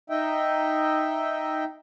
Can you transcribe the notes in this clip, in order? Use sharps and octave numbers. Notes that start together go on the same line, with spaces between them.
D#4 D#5 E5 G5